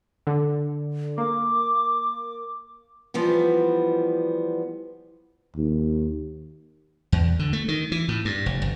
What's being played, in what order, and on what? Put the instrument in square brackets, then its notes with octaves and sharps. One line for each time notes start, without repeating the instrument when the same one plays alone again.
[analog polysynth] D3
[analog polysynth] A#3 [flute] D6
[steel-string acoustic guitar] E3 F3 G3 B3
[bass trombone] D#2
[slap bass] E2
D3
A3
D#3
E3
A2
G2
F1
G1